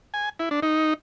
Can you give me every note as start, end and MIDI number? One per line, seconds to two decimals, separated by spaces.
0.14 0.29 80
0.39 0.49 64
0.51 0.60 62
0.63 0.94 63